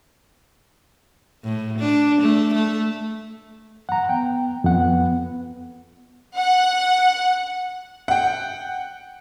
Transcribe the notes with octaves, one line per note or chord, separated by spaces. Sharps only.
A2
D4
A3
A3
F#5 A#5
B3 G5
F2 B3 F#5
F#5
F#5 G5